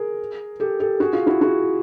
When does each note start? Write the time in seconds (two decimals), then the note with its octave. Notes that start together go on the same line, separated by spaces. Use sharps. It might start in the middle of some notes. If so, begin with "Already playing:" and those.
Already playing: G#4 A#4
0.60 G4 A4
0.80 G4 A4
1.00 F#4 G#4
1.13 F4
1.27 E4 F#4
1.41 F#4 G#4